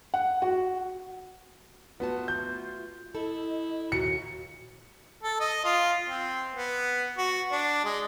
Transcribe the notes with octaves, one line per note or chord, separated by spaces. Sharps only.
F#5
F#4
A3 B3 F4 F#4 A5
G6
E4 A4 D#5
D#2 A#2 F#4 C#7
A4
D#5
F4
C4
B3
F#4
D4
G#3